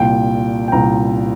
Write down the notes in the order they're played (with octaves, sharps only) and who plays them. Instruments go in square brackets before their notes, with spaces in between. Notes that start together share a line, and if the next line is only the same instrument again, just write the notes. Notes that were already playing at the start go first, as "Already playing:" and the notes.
Already playing: [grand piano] C2 A#2 G5
G5
C2 A#2 A#5